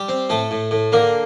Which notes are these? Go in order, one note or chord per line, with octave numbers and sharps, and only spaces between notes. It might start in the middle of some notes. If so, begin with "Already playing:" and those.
Already playing: G3 G4
C4
A2 A3 A4
A2
A2
D3 A#3 A#4